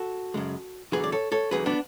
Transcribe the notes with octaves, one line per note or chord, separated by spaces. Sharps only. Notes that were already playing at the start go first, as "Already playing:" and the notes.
Already playing: F#4 A4
F#2 C#3 G#3
E2 D3 F#3 G#4 B4
D5
A4 C#5
A4 C#5
E2 D3 F#3 G#4 B4
B3 D4